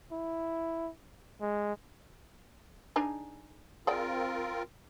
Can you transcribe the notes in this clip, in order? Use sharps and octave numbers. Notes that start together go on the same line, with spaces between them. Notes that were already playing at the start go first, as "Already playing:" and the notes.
E4
G#3
D4 D#4 G#4
C4 F4 G#4 A#4 D5 G5